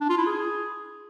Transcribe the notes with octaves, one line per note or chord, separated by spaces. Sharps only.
D4
F4
E4
G#4